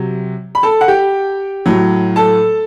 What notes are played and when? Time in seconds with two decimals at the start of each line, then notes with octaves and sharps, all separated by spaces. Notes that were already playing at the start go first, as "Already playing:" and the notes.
Already playing: C3 F#3
0.55 B5
0.63 A4 A5
0.81 F#5
0.88 G4 G5
1.66 A2 F#3
2.16 A4 A5